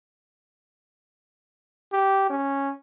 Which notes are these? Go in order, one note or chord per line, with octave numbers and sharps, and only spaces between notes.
G4
C#4